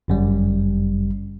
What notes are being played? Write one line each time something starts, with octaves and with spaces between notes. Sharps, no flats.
G1 F#2 G3